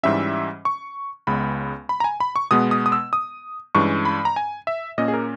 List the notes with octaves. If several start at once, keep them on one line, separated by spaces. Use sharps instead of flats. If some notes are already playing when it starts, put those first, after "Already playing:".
G#2 E3 G3 C#4 E5
C#6
C#2 C#3 G#3 B3 B5
B5
A#5
G#5
B5
C#6
B2 G#3 B3 D#6
D#6
D#6
E6
D#6
G2 E3 G#3 C#4 C#6
B5
A#5
G#5
E5
A#2 A#3 C#4 D#5
G#4
A#4